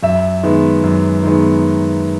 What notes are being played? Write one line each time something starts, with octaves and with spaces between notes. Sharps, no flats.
F#2 E5
D#3 G#3 B3
F#2
D#3 G#3 B3